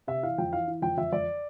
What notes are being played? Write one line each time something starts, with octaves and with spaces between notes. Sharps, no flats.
C3 E5
E3 F5
F2 G5
E3 F5
E3
F2 G5
F2 E5
F2 D5